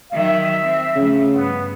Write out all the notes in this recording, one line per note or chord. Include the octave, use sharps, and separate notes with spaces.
D#3 F#3 E5
C4
C#3 F3 A3
G2 B3